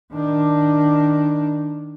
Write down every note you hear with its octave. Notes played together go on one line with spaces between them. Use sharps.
D#3 D4